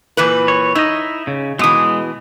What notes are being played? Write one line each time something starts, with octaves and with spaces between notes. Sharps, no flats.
A#2 E3 B4
C#5
D#4 E4 D#5
C#3
B2 E3 G#3 D#6